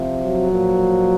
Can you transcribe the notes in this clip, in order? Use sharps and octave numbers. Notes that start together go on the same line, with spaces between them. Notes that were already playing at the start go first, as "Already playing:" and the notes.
Already playing: C3 F3
F#3
A#2 F3